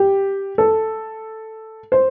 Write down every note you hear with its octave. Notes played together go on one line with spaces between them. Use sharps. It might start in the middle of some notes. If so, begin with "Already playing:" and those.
Already playing: G4
A4
C5